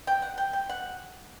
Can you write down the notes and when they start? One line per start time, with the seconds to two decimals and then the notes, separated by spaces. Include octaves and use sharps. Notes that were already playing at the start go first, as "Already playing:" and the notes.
0.07 G5
0.22 F#5
0.38 G5
0.53 G5
0.69 F#5